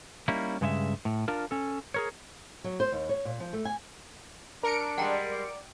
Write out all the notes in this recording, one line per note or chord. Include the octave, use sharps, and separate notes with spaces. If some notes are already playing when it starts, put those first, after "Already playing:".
G3 A#3 C#4 D#4 E4
G2 C#3 G#3 F#4 E5
A2
D4 F4 A#4
C#4 A4
G#4 A#4 C#5
F#3
C5
D#2
C#5
A#2
F3
A3
G#5
D4 A#4 C#7 D7
G3 G#3 F#5 G5 A#5
D5